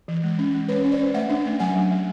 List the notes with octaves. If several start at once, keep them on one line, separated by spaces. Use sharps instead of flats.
E3
G#3
C#4
G#3
C#4 B4 C#5
C#4
C5 D5
C#4
A3 E5 F#5
D4
A3
F#3 F#5 G#5
F#3
F#3